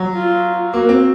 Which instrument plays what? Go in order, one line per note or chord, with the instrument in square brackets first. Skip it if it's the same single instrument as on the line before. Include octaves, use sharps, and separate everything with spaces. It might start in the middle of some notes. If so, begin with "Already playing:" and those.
Already playing: [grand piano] F#3
[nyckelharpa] F4
[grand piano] A#3 [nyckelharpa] F#4
[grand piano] C4